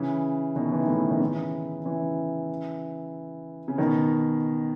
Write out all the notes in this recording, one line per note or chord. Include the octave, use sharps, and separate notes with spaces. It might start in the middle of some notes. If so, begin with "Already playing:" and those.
Already playing: C#3 E3
B2 D#3
E3
D#3
A2 C#3
D#3
C#3 E3
C#3 E3
C#3
B2 D#3